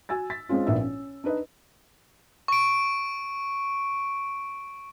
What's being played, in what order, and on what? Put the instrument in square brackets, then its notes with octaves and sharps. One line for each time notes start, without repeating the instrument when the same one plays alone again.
[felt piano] F#4 G#5 E6 A6
A6 B6
G#3 C4 C#4 F4
A#1 A#2 B3 E4 E5 E6
C#4
D4 D#4 B4 D#5
[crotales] C#6 D7